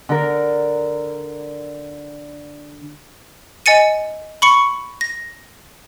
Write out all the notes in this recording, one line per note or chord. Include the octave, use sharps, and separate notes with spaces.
D3 A#4
D#5 G#5 A6 C#7 D#7
B5 C#6 C#7
A#6